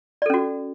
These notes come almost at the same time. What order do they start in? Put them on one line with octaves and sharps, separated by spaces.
D5 A4 C#4 F#4